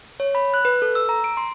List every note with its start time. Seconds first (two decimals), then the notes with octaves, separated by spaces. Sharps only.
0.20 C#5
0.35 B5
0.54 F#6
0.65 B4
0.82 A4
0.95 E6
1.09 A#5
1.24 D7
1.37 C6